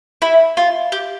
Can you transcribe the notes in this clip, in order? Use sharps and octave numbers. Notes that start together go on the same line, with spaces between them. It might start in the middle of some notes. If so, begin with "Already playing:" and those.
E4
F4
G4